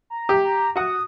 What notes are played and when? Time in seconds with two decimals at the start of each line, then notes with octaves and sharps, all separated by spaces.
0.10 A#5
0.29 G4
0.45 A#5
0.76 F#4 F#5 D#6